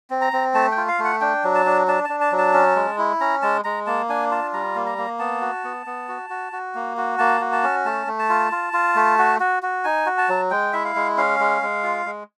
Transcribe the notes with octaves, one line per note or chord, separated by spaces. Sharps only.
C4
A#5
C4
A3 A5
G5
F4
F5
A3
F#5
D4 G5
F#3
A5
D4
D4 A5
D4 A5
A5
F#3
A5
C#4
G#3
E4
C#4 A#5
G#3 A5
G#3 A#5
A#3 A5
D4 G#5
F4 A5
G3 A#5
A#3
A#5
A#3
B3 A5
F#4
B3
B3
F#4
F#4
F#4
A#3
F#4
A#3 A5
F#4
A5
C#4
A3 A5
A3
A5
F4
F4
F4
A3
F#4
F#4
F#4
D#4 G#5
F#4
A5
F#3
G#3 G5
E4 E5
F5
G#3
C#4 F5
G#3
G#3
F4
G#3